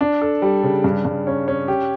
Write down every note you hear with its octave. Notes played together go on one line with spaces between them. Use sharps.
D4
A4
G3
C#3
G2
G2
C#4
C#4
G4